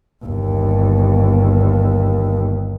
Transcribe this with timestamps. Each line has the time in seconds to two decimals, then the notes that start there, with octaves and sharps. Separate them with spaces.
0.25 G1 D#2